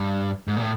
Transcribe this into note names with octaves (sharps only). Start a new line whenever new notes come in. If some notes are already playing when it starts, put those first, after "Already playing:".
Already playing: G2
G#2
A#2
A2